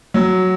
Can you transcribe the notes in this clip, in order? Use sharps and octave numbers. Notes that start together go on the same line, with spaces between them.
F#3